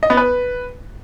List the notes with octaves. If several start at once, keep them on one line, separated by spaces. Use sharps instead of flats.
D#5
B3
B4